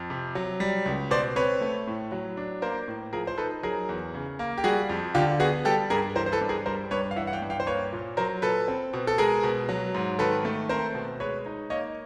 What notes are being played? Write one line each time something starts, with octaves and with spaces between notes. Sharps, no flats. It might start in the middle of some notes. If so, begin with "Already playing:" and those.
Already playing: F2
C3
F#3
G3
C#2
B2 C5 D5
C4 B4 C#5
A3
A2
F#3
D4
A#3 A#4 C5
A2
F3 G#4 A#4
C5
D#4 A4 B4
F#3 G#4 A#4
E2
C#3
A#3
G4
G3 F#4 G#4
F2
D3 F4 G4
B3 F#4 G#4
G3 G4 A4
G2 G#4 A#4
E3 A#4 C5
C5
A4 B4
G2
G#4 A#4
G3 A#4 C5
G2 B4 C#5
F5
E3 E5 F#5
F#5
F5 G5
G2
F5 G5
C5
A#3 B4 C#5
A#2
F#3 A#4 C5
A#2 A4 B4
C4
B2
A4
G#3 G#4 A#4
B2
F#3
G#2
D#3 A4 B4
A3
C4 A#4 C5
B2
G#3 B4 C#5
D#4
A#3 C#5 D#5